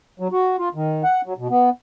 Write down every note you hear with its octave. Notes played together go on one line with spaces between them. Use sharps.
F#3
F#4
F4
D#3
F#5
F#3
B2
B3